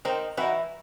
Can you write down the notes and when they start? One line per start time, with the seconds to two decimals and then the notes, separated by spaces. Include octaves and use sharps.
0.05 D#3 C4 D#4
0.37 E3 D#4 E4 F#4